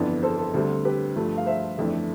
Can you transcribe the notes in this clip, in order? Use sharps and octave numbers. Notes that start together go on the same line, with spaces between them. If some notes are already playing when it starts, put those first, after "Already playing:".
Already playing: G1 F2 E3 B3 D4
A4 C5
A4
D2 D3 G3 C4
G4 B4
G2 F3 A3
F5
C5 E5
G1 F2 E3 A3 D4